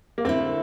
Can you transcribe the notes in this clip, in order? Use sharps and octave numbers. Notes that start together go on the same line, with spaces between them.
A#3
D3 A3 C4 E4